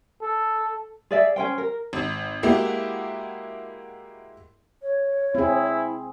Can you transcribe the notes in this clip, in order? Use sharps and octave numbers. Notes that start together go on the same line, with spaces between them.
A4
G#4 D5 E5
C#4 C5 G5
A#4
G#1
G#3 A#3 E4 F#4 G4
C#5
C4 E4 G#4